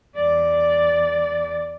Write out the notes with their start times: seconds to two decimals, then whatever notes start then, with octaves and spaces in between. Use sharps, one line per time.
0.16 E2 D5